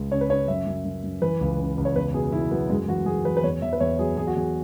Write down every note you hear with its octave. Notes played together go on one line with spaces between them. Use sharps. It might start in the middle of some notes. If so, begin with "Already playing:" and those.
Already playing: C#2 G#3
C#3 C#5
B4
C#3 C#5
F#2 E5
F#2
F#2
F#2
E3 B4
C#2
C#3
C#2
C#5
E2 B4
B2 G#4
E2 E4
F#3 B3
F#2 G#3
E3 F#4
F#2 G#4
E3 B4
B4
E2 C#5
E2 E5
B4
E2 C#5
F#3 G#4
E2 G#4
F#4
E2 G#4